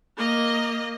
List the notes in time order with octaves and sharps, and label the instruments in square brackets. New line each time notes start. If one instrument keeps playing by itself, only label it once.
[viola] A#3 D#5